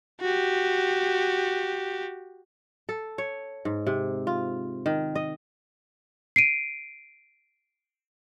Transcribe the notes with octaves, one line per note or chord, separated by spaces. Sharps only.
F#4 G4
A4
C#5
G#2
C3
F4
D#3
D#5
C7 D7 D#7